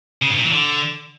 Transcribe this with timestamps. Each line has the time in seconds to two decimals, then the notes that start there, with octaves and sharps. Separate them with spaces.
0.22 C#3
0.29 G2
0.37 A#2
0.45 E3
0.52 D3